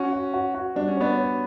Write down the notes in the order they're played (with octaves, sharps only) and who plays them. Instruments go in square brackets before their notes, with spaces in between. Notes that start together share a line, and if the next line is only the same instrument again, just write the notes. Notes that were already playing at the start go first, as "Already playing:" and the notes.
Already playing: [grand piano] C#4 [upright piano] F#4
[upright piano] F#4
F#4
F#4
[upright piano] G3 [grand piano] D4
[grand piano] C#4
[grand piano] B3 D4 [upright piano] C#5
[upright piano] C#5